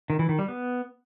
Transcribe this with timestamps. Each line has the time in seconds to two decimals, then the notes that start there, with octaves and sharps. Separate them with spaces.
0.10 D#3
0.19 E3
0.29 D#3
0.39 G3
0.48 B3